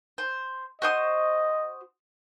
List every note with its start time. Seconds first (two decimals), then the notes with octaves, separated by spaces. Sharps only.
0.18 C5
0.82 F#4 C5 D#5 D#6